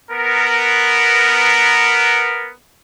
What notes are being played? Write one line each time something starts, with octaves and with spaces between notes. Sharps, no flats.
B3 A#4